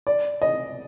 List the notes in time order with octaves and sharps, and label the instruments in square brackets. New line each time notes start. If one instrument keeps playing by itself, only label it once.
[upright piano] D5
D#5